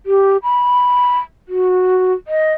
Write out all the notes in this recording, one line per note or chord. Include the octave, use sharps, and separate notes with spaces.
G4
B5
F#4
D#5